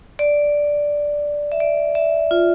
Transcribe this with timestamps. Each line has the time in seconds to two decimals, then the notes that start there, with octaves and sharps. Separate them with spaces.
0.19 D5
1.52 E5
1.60 D5
1.95 E5
2.31 F4